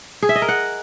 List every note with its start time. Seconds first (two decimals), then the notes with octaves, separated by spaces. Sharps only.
0.22 G#4
0.29 E5
0.35 D#5
0.42 A#4
0.48 F#5